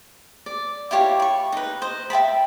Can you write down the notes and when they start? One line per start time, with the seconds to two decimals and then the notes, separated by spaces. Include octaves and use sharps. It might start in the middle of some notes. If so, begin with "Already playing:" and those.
0.46 D5
0.91 E4 F4 G4 C#5
1.20 B5 C#6
1.53 D#4 B4
1.82 C5 D#5
2.10 E5 G5 A5 B5